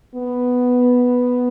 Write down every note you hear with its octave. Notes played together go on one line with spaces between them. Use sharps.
B3